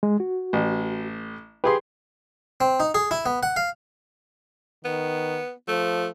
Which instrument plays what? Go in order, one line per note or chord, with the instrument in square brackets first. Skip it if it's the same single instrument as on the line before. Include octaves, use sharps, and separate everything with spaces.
[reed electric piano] G#3
F#4
[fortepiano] A1
[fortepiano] G4 G#4 C6 [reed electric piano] B4
[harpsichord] C4
D#4
G#4
E4
B3
F#5
F5
[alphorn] D#3 [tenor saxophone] B3
[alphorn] F3 [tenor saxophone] A3